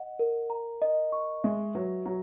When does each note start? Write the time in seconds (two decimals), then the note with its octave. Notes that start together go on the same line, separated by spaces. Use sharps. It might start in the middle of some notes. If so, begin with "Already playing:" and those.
Already playing: D#5 F#5
0.19 A#4
0.50 A#5
0.82 D#5
1.12 C#6
1.44 G#3 E5
1.75 F#3 B4
2.06 F#3 A#5